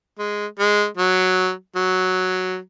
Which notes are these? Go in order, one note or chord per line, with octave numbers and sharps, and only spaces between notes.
G#3
G#3
F#3
F#3